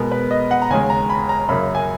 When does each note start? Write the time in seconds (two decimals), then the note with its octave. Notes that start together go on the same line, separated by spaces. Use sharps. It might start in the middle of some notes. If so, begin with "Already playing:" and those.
Already playing: B2 G#3 B3 A#4
0.12 B4
0.31 D#5
0.51 F#5
0.62 A#5
0.70 D#2 C#3 G#3 G#5
0.90 A#5
1.10 B5
1.29 A#5
1.49 F#2 C#3 F#3 A#3 B5
1.75 G#5